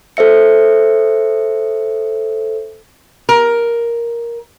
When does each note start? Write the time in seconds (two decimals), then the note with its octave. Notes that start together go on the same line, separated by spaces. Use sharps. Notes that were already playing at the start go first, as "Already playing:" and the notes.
0.17 A4 C5 E5 C#7
3.29 A#4